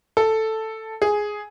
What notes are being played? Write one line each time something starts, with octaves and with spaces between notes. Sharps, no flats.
A4
G#4